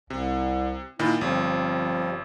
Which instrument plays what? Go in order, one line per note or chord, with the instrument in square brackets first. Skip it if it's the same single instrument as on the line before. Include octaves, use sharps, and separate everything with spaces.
[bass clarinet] C2 [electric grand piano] C3
[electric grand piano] A#2 D#3 [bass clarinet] E4
[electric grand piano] G1 [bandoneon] F3 G3 [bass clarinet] C4